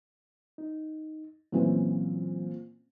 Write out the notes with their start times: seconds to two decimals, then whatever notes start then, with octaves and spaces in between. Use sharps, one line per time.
0.58 D#4
1.52 A#2 E3 F#3 C4 C#4